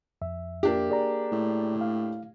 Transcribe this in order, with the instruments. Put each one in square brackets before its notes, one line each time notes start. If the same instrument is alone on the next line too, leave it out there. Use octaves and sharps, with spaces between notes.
[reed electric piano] F2 E5
[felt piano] A#3 D4 G4
[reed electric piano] G#4 D5 A#5
[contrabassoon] A2
[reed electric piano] F5